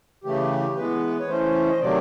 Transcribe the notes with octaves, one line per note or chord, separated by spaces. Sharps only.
C#3 E3 A3 G4
E3 G#3 B3 B4
C#5
E3 A3 C#4 C5
D#5
C3 D#3 F#3 A3 D5